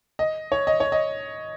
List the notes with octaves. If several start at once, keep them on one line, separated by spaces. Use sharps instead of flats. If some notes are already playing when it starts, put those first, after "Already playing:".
D#5
C#5
D#5
C#5
D#5